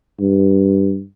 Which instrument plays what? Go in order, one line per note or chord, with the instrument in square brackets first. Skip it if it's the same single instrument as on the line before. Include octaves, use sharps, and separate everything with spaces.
[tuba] G2